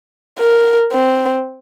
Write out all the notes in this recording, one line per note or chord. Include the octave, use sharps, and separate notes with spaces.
A#4
C4